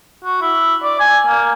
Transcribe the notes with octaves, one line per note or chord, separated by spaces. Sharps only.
F#4
E4
D5
G#5
A#3